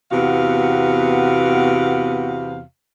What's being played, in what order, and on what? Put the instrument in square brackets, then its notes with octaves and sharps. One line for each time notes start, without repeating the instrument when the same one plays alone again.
[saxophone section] E2 C3 B3 F#4 F5